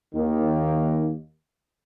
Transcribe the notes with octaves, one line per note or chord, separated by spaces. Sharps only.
D#2 D#3 A#3